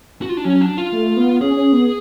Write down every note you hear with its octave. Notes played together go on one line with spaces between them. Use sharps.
F#4
F4
D4
F#3 C#4
D4
F4
A3
B3
C#4 G#4
C#4
B3